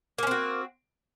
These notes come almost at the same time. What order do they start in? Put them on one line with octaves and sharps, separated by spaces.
A#3 C#4 C4 F#4